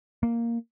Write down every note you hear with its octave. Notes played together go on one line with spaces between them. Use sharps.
A#3